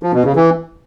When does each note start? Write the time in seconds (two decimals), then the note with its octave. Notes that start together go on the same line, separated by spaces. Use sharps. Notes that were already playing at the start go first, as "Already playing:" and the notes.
0.03 F3
0.14 B2
0.25 C#3
0.36 E3